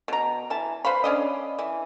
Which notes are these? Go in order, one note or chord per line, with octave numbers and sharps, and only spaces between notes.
B2 A#5
E3 A5
B4 C5 F5 B5
C#4 D4 D#5
E3